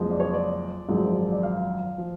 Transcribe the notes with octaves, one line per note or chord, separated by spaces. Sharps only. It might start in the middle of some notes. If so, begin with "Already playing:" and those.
Already playing: F#1 F2 F3 G#3
D5
C#5
D5
G#1 F#2 F3 G#3
D5
F5
F3